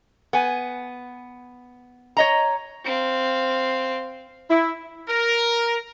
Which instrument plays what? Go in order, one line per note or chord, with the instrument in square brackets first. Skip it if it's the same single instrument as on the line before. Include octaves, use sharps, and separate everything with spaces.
[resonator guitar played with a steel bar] B3 G#5
C#5 D#5 A#5
[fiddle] C4 F5
[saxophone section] E4
[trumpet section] A#4